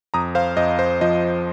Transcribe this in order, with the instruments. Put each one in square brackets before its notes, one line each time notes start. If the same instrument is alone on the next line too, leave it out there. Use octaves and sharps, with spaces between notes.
[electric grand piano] F2 A#5 D#6
C5 F5
F2 D#5
C5
F3 D#5